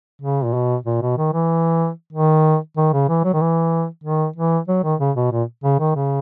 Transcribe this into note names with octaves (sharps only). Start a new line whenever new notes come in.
C#3
A#2
B2
A#2
B2
D#3
E3
D#3
D#3
C#3
E3
F#3
D#3
E3
D#3
E3
F#3
D#3
C#3
B2
A#2
C#3
D#3
C#3